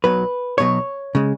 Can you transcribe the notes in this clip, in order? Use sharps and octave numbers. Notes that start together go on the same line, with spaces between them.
B1 B2 F#3 B4
B1 B2 F#3 C#5
C#3 G#3